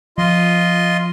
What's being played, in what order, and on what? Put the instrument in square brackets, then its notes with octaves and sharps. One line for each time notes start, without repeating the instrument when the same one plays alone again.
[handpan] F3 [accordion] F4 D#5 C6